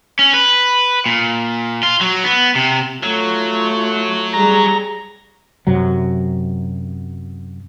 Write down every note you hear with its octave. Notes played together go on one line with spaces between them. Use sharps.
C#4
B4
A#2
F4
F#3
B3
C3
F#3 A3 F4 C#5
G3 G#4 A#5
F#2 C3 F#3